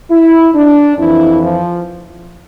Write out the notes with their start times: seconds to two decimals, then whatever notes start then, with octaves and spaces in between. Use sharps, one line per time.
0.10 E4
0.54 D4
0.98 F2 E3 E4
1.42 F3